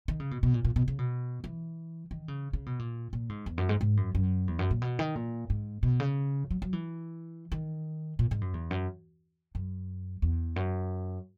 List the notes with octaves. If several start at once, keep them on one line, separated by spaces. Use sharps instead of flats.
D#3
C#3
B2
B2
A#2
A#2
B2
C#3
B2
E3
D#3
C#3
C#3
B2
A#2
A#2
G#2
E2
F#2
G#2
G#2
F#2
F#2
E2
F#2
A#2
B2
D#3
A#2
G#2
B2
C#3
F#3
F#3
E3
D#3
A#2
G#2
F#2
E2
F#2
F#2
E2
F#2